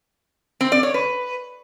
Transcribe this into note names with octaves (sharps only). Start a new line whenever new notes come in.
C4
D5
C#5
B4